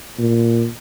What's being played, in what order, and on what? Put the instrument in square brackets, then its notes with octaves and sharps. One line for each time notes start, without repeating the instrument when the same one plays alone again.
[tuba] A#2